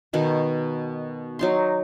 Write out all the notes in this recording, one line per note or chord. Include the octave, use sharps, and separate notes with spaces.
B2 D#3 B3
F#3 D#4 C6